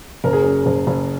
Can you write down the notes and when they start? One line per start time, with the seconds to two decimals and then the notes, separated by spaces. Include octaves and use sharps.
0.24 F#1 A#4
0.33 G#4
0.43 F#2 A#4
0.66 F#1
0.87 F#1